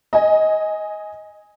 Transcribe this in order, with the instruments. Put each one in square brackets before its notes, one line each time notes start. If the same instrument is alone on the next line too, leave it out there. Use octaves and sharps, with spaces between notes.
[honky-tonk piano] D#5 G#5